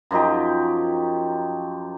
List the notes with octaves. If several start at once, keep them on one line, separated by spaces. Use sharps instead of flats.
F#2 F3 D#4 G4